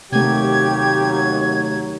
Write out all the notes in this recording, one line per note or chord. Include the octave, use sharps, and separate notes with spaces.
D#2 C3 F#3 A3 G4 G#6